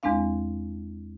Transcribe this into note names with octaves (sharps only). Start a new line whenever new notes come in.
E2 G#3 C4 D4 F5